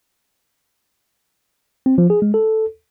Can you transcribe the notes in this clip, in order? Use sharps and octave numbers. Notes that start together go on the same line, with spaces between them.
C4
F3
G#4
G#3
A4